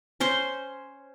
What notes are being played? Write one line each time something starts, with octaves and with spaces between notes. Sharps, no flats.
C#4 C5 C6